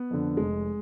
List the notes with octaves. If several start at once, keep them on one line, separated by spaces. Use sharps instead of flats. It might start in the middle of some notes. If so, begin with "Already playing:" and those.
Already playing: B3
F2 D3
F1 G#3